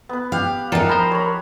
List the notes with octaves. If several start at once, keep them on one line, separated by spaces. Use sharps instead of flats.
B3 B4
G4 F5 F#5
E2 D#4 F4 A4 A#4
F3 C5 A#5 B5
C#5 B5